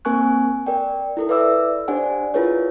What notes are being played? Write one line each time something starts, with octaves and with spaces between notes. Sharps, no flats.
A#3 C4 A#4 G#5 C#6 F#6
A#4 D5 G5
E4 A4 A#4
B4 D5 E5 D6 E6
D4 G4 C5 D5 F#5 G#5
E4 F4 G#4 A#4 B4 C#5